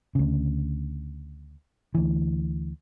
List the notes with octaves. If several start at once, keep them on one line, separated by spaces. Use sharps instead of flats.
D2 C#3
D2 E3